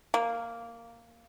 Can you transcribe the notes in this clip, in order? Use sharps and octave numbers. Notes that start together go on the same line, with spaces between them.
A#3